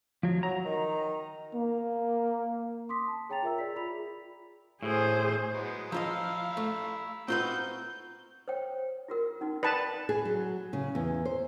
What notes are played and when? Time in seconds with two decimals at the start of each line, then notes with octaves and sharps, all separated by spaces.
0.23 F3 F#3
0.43 F#3 A#5
0.65 D#3
1.55 A#3
2.89 C6 D6 D#6 B6
3.07 A5
3.29 G#4 C#5 G5 A#5 A6 F7
3.42 F4 G#4 A#4 E5 A#5 E6
3.58 D5 B6
3.76 F4 G#4 B5 B6 F7
4.83 A2 G#4 C5
5.53 F#3 G#3 B3
5.92 F3 F4 D#5 F5 A#5 B5 E6
6.57 A3
7.28 C4 D#4 F4 F#4 B4 G6
8.48 C5 C#5 G5
9.08 F4 F#4 A#4
9.41 C#4 D#4 F#4
9.63 B4 D5 G5 A5 B5
10.09 G#4
10.25 F#3
10.73 C#3
10.95 E2
11.25 C5